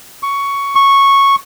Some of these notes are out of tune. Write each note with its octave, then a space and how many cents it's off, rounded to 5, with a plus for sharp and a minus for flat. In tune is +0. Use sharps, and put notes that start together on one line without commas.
C#6 +10
C#6 -5